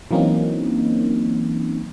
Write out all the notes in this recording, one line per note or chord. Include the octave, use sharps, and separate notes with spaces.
E3 F#3 A#3 C4 C#4 D#4